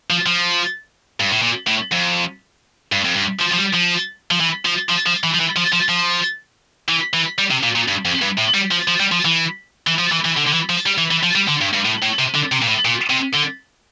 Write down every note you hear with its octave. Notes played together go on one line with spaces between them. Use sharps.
F3
F3
G2
A2
A#2
A2
F2
G2
F2
G2
F3
F3
G3
F3
F3
E3
F3
F3
F3
E3
F3
E3
F3
F3
F3
E3
E3
G3
C3
A#2
A#2
G2
F2
G2
A2
G3
F3
F3
G3
F3
E3
E3
F3
E3
E3
D3
D3
E3
F3
G3
E3
E3
F3
G3
D3
G2
G2
A2
A2
C3
D3
C3
A#2
A2
A#2
C3
D3